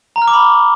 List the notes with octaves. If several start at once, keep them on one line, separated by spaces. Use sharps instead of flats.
A#5
F6
D6
B5